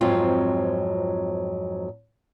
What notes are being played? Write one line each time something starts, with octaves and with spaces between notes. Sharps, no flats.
F2 G#2 F#3 C4 F4